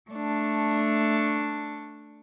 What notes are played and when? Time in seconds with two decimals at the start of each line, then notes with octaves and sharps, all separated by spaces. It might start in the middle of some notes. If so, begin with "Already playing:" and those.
0.11 A3 D4